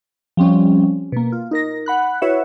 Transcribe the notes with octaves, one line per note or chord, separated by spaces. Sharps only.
F3 G3 C4 C#4
B2 A#3
F4
D#4 A#4 A#6
F#5 B5 F#6
E4 F#4 B4 C#5 E5 F#5